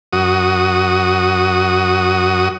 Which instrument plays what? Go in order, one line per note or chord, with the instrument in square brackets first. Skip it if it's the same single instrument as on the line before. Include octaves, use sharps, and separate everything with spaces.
[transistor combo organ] F#2 F#4 D#6